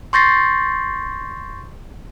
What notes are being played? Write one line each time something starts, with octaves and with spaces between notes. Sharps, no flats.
C6 C#6 G6 A6 A#6 C7